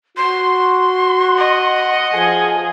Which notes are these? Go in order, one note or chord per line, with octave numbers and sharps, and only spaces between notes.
F#4 C6
D#5 F#5
F3 G#4 G#5